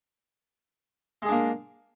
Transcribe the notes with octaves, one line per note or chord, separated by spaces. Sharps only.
G#3 A#3 D4 G#4